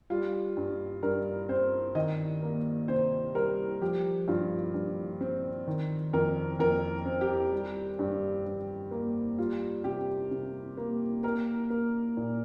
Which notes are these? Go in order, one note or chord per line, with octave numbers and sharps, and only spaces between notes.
G3 F4
G2
G2 A#4
C4 C5
D#3 D#5
A#3
C3 C5
G3 A#4
F3 G4
G2 F4
G2
C4
D#3
F2 A#4
F2 A#4
C4
G4
G3
G2
G2
A#3
G3 F4
C3 G4
C3
A#3
A#3 A#4
A#3
A#2